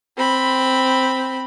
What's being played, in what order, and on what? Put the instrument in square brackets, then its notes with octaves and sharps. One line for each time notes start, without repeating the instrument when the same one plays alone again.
[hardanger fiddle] C4 B5